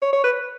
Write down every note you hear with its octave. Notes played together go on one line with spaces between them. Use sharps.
C#5
C#5
B4